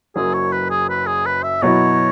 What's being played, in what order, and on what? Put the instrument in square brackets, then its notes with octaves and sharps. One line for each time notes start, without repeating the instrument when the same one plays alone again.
[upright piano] F#1 F#2 F#3 [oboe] G#4
[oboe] C#5
B4
G#4
B4
G#4
B4
E5
[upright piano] B2 F#3 E4 [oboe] C#5